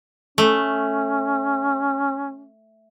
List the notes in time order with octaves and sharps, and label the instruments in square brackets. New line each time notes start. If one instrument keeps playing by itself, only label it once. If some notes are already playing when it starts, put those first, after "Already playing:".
[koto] A3 [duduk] C#4